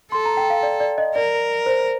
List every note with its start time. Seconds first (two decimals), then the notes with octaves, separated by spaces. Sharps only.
0.12 A4 C6
0.25 A#5
0.37 G5
0.50 F5
0.63 D5
0.80 D5
0.98 D#5
1.15 A#4 D5
1.66 C5